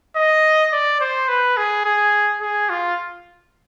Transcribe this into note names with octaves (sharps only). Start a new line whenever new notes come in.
D#5
D5
C5
B4
G#4
G#4
G#4
F4